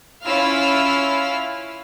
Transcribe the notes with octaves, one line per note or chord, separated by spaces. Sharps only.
C#4 E4 F4 F5 E6 F6